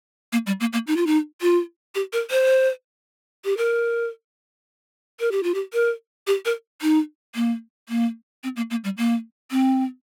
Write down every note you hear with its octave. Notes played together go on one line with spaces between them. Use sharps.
A#3
G3
A#3
A#3
D#4
F4
D#4
F4
G4
A#4
C5
G4
A#4
A#4
G4
F4
G4
A#4
G4
A#4
D#4
A#3
A#3
C4
A#3
A#3
G3
A#3
C4